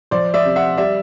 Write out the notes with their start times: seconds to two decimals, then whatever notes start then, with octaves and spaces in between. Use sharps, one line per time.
0.11 F3 C5 D5
0.34 D5 E5
0.45 C3
0.56 E5 F#5
0.78 G3 D5 E5